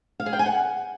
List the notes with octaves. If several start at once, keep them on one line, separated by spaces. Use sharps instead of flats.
F5
G#4
G5
G#5
F#5